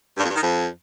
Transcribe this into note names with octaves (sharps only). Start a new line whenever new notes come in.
G2
F2
G2
D#3
F2